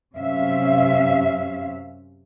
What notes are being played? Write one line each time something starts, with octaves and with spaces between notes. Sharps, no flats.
F#2 C3 C#4 E5 F5